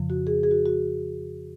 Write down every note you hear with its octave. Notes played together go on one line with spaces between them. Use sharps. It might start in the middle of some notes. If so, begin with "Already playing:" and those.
Already playing: F2 C#3 F3
F#4
G#4
G#4
F#4
F#4